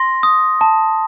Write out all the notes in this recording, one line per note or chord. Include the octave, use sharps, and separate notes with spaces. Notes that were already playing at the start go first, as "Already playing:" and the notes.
Already playing: C6 A#6
D#6
A5